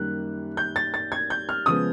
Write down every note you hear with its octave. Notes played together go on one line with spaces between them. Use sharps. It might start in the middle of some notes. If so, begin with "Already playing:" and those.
Already playing: F#2 D#3 G3 A#3 F#6
G6
A6
A6
G#6
G6
F6
C#3 F3 G#3 B3 D#6